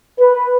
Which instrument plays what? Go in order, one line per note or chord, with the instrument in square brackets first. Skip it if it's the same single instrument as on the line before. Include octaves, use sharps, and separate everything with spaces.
[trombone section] B4